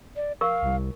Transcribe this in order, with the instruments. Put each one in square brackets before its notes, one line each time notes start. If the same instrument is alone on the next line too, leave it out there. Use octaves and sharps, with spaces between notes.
[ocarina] D5
[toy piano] A#4 C#6 [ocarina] F5
[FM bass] C2